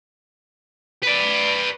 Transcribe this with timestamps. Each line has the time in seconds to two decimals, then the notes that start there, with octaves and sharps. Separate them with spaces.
1.03 B4 D5